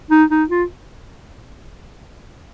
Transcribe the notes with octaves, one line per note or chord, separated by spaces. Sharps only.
D#4
D#4
F4